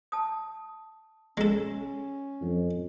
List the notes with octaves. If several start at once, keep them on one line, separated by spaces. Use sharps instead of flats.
A5 D#6
G#3 C#4 A4
F2